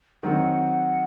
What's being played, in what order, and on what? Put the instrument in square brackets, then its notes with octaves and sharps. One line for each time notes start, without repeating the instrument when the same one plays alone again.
[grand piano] D#3 F#3 C4 [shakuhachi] F#5